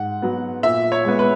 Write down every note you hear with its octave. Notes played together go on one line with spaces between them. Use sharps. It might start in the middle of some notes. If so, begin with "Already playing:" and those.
Already playing: G#2 F#5
F#3 B3
A#2 E5
C#5
G#3 B3
B4